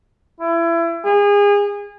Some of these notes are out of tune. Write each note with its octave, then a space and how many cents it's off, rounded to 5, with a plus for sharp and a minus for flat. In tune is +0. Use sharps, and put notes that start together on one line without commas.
E4 +30
G#4 -30